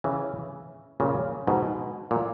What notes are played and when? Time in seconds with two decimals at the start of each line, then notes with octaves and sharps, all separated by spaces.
0.04 C#3 E3
1.00 A#2 C#3
1.47 G#2 B2
2.11 A#2